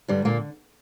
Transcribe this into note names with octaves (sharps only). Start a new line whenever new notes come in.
G2 D3 G3
A#2 A#3